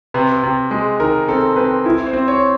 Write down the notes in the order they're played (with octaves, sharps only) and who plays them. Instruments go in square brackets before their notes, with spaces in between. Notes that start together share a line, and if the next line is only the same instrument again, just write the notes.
[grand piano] C3 B4
C3
G#3
D#3 A#4
C4 A4
C4 B4
E4
C5
C4
C#5